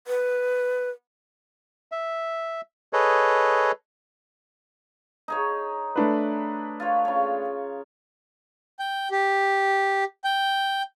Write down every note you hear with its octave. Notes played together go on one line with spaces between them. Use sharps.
B4
E5
G#4 A4 B4 C#5 D#5
D#4 G#4 C#5
A3 D4 B4
F4 C#5
C#3 C#5
G5
G4
G5